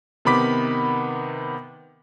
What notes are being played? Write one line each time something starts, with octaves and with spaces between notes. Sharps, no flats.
C3 D#3 B3 B5 D6 B6